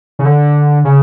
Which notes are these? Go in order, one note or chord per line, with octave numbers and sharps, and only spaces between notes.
C#3
D3
C#3